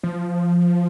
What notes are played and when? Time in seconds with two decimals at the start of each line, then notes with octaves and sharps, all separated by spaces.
0.03 F3